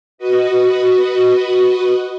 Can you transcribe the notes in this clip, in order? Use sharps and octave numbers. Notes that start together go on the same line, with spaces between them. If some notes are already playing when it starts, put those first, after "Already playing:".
F#4 B4 D#5